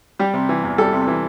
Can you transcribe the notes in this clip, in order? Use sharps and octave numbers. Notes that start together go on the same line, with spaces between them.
G3 G4
C3
E3
E2
G3 A4
C3
E3